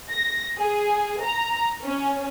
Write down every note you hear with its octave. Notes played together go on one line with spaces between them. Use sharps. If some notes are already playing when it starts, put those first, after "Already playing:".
A#6
G#4
A#5
C#4